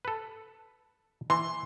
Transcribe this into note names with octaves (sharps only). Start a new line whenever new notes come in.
A4 B4
E3 C6